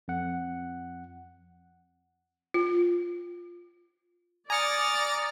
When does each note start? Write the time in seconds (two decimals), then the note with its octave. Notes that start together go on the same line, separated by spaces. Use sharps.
0.08 F2 F#5
2.54 F4
4.50 D5 G#5 A#5 D#6 F6 A6 C#7